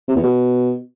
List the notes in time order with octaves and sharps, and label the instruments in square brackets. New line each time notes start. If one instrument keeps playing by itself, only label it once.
[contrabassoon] C3
E2
B2